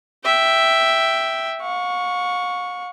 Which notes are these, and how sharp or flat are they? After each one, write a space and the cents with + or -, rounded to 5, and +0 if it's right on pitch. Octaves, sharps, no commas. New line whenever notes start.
E5 +0 G5 +0
F5 +45 C#6 +0